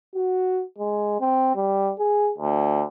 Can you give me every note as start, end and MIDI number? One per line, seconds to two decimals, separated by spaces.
0.15 0.63 66
0.78 1.19 56
1.20 1.53 60
1.55 1.91 55
1.98 2.31 68
2.38 2.84 38